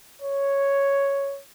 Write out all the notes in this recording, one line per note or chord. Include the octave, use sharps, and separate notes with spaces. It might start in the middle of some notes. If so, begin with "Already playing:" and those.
C#5